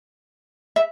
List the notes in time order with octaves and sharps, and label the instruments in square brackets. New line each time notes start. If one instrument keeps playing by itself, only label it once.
[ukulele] E5